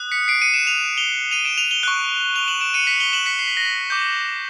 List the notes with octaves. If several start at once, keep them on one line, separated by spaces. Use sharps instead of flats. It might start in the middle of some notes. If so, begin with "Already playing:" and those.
Already playing: D#6 F#6
B6 C#7
C7 D7
C#7 D#7
D7 E7
D#7 F7
F7 G7
D#7 F7
D7 E7
D#7 F7
F7 G7
C#6 F#6
F7 G7
E7 F#7
D7 E7
C#7 D#7
B6 C#7
F7 G7
E7 F#7
B6 C#7
C7
B6
A#6
B6
D6 G6